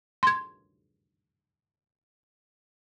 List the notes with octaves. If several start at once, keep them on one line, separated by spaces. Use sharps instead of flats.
C6 G#6